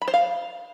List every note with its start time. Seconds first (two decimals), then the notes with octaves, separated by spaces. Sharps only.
0.02 B5
0.08 C5
0.14 F5